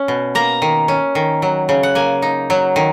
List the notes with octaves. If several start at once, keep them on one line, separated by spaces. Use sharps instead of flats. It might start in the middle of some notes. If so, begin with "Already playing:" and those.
Already playing: C#4
B2
A#3 A#5
D#3
C#4
D#3
F#3
C#3
F#5
A#3 G#5
D#4
F#3
D#3